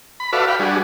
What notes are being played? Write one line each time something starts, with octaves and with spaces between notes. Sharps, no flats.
B5
F#4 A4 B4 D5 E5 F5
F5 G5 B5
G3 D4 F#4 G#4